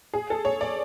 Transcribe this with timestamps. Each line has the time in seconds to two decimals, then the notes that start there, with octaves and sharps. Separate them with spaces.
0.14 G#4
0.30 A4
0.45 C#5
0.61 D5